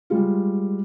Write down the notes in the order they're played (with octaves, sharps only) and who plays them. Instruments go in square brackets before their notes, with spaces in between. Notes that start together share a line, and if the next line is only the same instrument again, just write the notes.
[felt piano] G3 G#3 F4